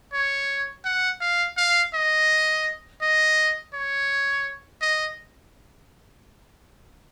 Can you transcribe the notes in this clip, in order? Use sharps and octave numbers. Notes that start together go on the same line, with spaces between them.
C#5
F#5
F5
F5
D#5
D#5
C#5
D#5